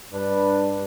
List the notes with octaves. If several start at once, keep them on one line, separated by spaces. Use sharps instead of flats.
G2 D4 B4